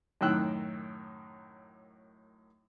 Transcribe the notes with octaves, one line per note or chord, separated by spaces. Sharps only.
F#2 A2 D#3 G5 E6 F#6